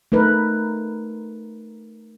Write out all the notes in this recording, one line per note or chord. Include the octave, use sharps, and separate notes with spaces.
A3 D#4 A#4 B4